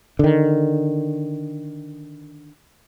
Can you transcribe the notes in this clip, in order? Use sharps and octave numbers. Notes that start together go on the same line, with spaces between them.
D3 D#3